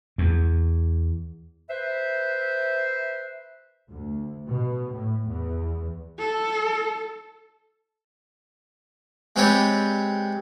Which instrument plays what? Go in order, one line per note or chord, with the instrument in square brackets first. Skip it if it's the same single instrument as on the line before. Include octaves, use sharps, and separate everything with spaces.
[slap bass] E2
[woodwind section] B4 C5 E5
[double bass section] D2
B2
A2
E2
[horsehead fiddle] A4
[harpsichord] G#3 C4 G4 B4 C#5 D5